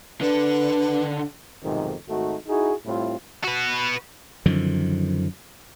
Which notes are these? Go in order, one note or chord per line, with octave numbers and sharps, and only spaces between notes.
D3 D4 B4
B1 F2 G#2 C3 D#3
G#1 A3 D#4 F#4
D#4 E4 F#4 G#4
A2 G3 C4 E4 F4
F#4 B4
F#2 D3 D#3 F3